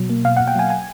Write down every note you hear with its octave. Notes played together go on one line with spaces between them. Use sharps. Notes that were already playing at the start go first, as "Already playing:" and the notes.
Already playing: B2 F#3
A#3
B2 F5
F#5
B2
G5
F#3 G#5
G#5